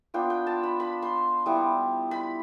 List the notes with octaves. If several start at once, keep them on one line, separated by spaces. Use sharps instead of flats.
B3 D4 F4 G5
G5
A5
B5
B5
C6
G3 B3 E4
B5